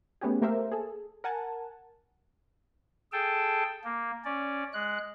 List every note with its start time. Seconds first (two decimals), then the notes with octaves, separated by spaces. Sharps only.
0.21 A3 B3 C#4 G4 G#4
0.42 A3 A#3 G4 A#4 C5 E5
0.72 G#4 A4
1.24 A#4 F#5 G#5 A5
3.12 G#4 A4 G5 A5
3.84 A#3
4.25 C#4 D5
4.74 G#3 F#6